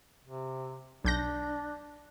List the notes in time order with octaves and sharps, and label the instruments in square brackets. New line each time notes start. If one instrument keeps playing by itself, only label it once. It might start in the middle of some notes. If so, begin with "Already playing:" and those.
[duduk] C3
[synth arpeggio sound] B1 G6 A#6 [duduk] D4